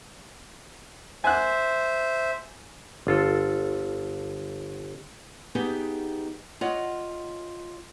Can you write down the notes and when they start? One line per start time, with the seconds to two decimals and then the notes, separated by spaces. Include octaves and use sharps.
1.24 C5 E5 G#5 F#6
3.07 G1 F4 A4
5.55 B3 D#4 G4 G#4
6.61 F4 C#5 D#5 F#5